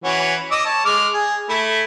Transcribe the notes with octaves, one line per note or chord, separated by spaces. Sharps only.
E3 C#4 F#4
D#5 D6 E6
C#5 A5
G#3 D6 F6
G#4
A3 E4